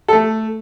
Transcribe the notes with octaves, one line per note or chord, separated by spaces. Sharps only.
A4
A3